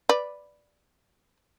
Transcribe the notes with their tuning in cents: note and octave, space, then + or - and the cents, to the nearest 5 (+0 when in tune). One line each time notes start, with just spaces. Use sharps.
B4 +0 D5 +0